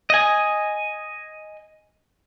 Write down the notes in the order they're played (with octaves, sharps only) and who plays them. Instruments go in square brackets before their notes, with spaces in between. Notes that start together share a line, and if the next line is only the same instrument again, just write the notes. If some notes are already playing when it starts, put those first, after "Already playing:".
[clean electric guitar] D#5 G#5